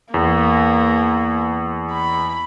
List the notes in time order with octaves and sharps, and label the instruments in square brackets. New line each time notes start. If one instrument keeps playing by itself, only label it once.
[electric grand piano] E2 [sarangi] A#3
[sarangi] B5